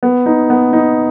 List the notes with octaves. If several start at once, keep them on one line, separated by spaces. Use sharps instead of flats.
B3
D#4
B3
D#4